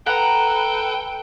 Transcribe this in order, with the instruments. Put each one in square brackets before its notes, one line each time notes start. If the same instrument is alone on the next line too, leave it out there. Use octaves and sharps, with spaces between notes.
[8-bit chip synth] A4 B4 [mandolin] F#5 A#5 [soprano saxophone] G5